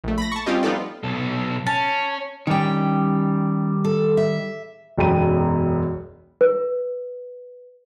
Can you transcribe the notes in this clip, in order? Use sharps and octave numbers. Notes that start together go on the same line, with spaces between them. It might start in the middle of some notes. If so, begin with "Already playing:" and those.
A#1 A3
B5 A#6
A5 C#6
G3 C4 C#4 F4 G4 D#5
F3 B3 D#4 F4 A4 D5
B1 A4
C#4 A5
D#3 G3 C#4 G5
A4
E5
E1 B1 F#2 G5 B5 D#7
B4